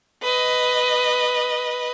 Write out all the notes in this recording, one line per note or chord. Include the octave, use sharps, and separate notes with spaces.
B4 D#5